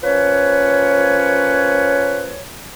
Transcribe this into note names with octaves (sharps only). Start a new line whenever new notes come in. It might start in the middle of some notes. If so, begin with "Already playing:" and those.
F3 A#3 C#4 B4 C#5